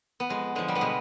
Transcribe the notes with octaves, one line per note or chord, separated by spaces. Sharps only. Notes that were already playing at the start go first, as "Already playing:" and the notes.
B3
F2 G#3
D3 F3 G#3
G3
B3
B2 G#3